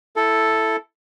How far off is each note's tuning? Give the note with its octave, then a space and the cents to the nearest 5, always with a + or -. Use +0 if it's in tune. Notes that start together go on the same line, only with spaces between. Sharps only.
E4 +0 A4 +0